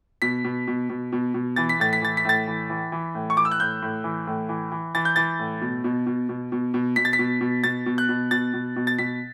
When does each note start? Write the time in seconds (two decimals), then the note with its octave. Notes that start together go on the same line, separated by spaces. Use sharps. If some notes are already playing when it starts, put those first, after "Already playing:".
0.22 B2 B6
0.44 B2
0.67 B2
0.89 B2
1.12 B2
1.34 B2
1.56 E3 A6
1.69 B6
1.80 A2 A6
1.93 B6
2.02 E3 A6
2.17 B6
2.25 A2 A6
2.47 E3
2.70 E3
2.92 E3
3.15 A2
3.30 C#6
3.36 E3 D6
3.45 E6
3.51 F#6
3.60 A2 G6
3.82 A2
4.04 E3
4.27 A2
4.49 E3
4.72 E3
4.95 E3 A6
5.05 G6
5.16 E3 A6
5.39 A2
5.62 B2
5.84 B2
6.07 B2
6.29 B2
6.52 B2
6.74 B2
6.96 B2 B6
7.05 A6
7.13 B6
7.19 B2
7.41 B2
7.64 B2 A6
7.86 B2
7.98 F#6
8.09 B2
8.31 B2 A6
8.54 B2
8.76 B2
8.87 A6
8.98 B2 B6